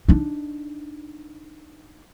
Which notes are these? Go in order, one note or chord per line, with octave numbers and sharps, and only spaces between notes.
D4 D#4